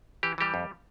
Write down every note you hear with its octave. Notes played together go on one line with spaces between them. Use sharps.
E3 G4
E3 G3 G4
F2